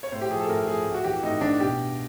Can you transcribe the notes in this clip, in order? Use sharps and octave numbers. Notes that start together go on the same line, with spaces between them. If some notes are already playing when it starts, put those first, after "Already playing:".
C#5
A2 C5
G4
F3 G#4
A4
A2 A#4
F3 G#4
A2
F#4
E3 G4
A2 D#4
E3 D4
B2 G4